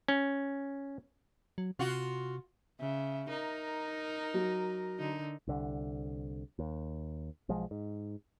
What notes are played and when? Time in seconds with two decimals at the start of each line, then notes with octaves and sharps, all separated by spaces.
0.08 C#4
1.58 F#3
1.79 C3 F4 F#4
2.80 C#3 E5
3.29 D#4 A#4
4.34 F#3
4.99 D3 D#4
5.47 C2 D3
6.59 D#2
7.49 B1 F3 G#3
7.71 G#2